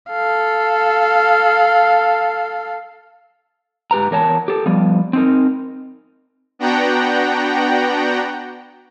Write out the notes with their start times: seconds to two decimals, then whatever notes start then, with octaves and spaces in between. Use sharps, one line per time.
0.10 A4 F5
3.91 G#2 G4 B4 A#5
4.11 E2 A#4 C#5 A5
4.48 G4 A4
4.66 F3 G3 B3
5.13 C4 D#4 A#4
6.59 B3 D4 F#4 F#5 G5 A#5